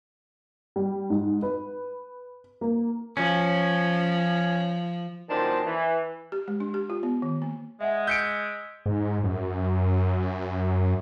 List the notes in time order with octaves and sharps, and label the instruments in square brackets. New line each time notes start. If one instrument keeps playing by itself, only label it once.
[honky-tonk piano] G3
G#2
B4
A#3
[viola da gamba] F3 [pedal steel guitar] C#4
[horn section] F#2 A#2 D#3 D4 C5 A5
E3
[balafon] G4
G#3
D4
G4
F4
B3
D#3
A#3
[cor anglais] G#3 [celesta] E5 F#5
[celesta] E6 B6 [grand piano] G6 C#7 D7
[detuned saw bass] G#2
F#2